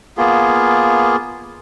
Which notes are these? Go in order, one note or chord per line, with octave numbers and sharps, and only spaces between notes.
A#3 B3 F4 G#4